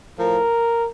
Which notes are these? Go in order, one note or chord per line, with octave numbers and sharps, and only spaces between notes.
A2 F3 A#4